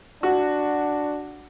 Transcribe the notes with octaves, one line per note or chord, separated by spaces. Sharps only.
D4 F#4